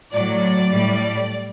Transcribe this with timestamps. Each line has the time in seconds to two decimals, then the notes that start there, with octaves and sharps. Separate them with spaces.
0.13 A2 F#3 D5
0.71 A2 G3